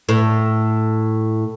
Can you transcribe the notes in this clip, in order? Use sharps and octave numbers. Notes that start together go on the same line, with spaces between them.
A2